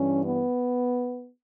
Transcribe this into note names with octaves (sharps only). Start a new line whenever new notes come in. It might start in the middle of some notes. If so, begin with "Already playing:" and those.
Already playing: G2 E3 C#4
B3